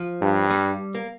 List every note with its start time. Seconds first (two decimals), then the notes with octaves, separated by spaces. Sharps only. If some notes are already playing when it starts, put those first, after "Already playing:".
Already playing: F3
0.22 G2
0.50 G3
0.95 A#3